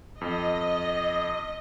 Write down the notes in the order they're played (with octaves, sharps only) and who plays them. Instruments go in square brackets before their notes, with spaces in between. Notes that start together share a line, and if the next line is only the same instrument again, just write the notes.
[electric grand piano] F2 [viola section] D#5